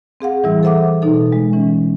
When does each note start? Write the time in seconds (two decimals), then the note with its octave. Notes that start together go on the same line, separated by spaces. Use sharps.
0.21 C4 G#4 F5 F#5
0.43 A2 E3 G3 E4
0.63 A4 C5 E5 F#5 D6
1.02 B2 D#4 A4
1.32 G#3
1.53 E3 C#4